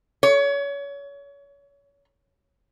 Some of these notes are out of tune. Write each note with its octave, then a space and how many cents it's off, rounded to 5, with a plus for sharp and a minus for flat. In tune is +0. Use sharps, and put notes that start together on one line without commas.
C#5 +30